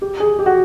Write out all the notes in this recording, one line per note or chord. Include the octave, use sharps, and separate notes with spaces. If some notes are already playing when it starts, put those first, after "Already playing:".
G4
G#4
G4
F#4